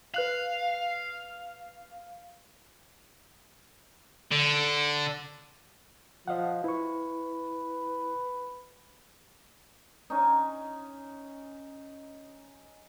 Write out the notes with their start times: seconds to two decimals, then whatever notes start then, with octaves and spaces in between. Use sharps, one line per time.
0.14 B4 F5 F#6 F#7
4.31 D3
6.28 F3 D#5 F5 F#5
6.64 E4 B4 C#6
10.10 C#4 D#4